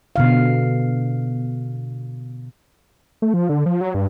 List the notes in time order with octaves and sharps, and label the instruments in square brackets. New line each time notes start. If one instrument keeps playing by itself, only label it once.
[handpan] B2 D3 F5
[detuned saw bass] A3
F3
D3
F3
F#3
G2